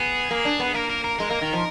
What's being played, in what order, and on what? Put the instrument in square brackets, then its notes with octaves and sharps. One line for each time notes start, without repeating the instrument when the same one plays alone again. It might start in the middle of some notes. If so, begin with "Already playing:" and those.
Already playing: [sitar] B3 [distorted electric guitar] G#4
[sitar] A#3
D4
B3
[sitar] A#3 [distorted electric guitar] A#4
[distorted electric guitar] A#4
A#4
[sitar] G#3 [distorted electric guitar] A#4
[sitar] A#3
D#3
F3